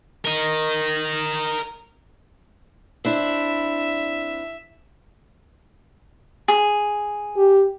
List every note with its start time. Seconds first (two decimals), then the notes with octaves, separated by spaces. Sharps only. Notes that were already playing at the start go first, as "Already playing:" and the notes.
0.25 A#4 D#5
3.05 C4 D4 E4 E5
6.48 G#4
7.37 G4